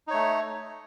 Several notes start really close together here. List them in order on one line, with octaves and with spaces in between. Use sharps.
D#4 C#5 A3